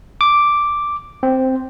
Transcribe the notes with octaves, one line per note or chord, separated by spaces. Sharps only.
D6
C4